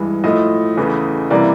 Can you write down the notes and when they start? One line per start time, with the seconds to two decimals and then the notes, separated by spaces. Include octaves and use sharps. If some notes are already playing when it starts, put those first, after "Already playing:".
Already playing: G2 E3 G#3
0.24 A2 F3 A3 D#5
0.77 E2 C#3 E3 A3
1.30 C3 E3 G3 A#3 D5